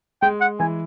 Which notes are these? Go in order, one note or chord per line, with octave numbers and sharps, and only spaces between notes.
G#3 G5
F#5
E3 G#5